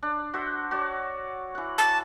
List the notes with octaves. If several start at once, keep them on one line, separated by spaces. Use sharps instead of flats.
D4
F#4 C5 E5
F#4 C#5 D5
E3 F#5
A5